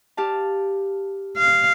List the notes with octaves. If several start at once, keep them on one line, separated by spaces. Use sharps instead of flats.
G4 F5 A5
F5